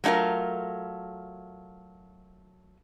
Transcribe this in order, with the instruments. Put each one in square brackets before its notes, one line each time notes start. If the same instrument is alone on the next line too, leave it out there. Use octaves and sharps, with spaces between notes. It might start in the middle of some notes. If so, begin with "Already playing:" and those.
[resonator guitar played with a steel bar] F#3 A3 E4 F4 A#4